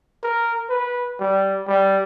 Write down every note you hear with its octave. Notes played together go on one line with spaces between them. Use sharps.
A#4
B4
G3
G3